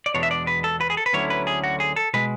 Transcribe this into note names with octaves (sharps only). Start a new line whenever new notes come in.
D5
E2 B2 G#3 D4 C#5
E5
D5
B4
A4
B4
G#4
A4
B4
D2 D3 F#3 C#4 E4 C#5
B4
G#4
F#4
G#4
A4
B2 G#3 B4